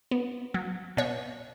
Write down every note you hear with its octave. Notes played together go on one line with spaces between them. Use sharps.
B3
F#3
B2 C#5